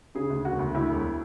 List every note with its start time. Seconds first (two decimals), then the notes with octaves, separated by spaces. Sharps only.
0.15 C#3 G#4
0.30 D2
0.45 E1 F#4
0.59 D2
0.74 D2 E4
0.89 E1